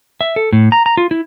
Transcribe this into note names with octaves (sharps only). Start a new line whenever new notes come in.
E5
A4
A2
A#5
A#5
F4
E4